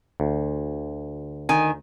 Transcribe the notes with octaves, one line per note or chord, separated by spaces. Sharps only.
D2
D#3 G#5